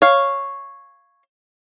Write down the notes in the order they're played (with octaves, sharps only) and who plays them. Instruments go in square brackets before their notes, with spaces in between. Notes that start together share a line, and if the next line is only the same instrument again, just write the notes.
[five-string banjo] C#5 F5